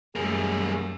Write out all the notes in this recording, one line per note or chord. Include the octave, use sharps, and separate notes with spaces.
F#2 G3 A3 A#3 G#4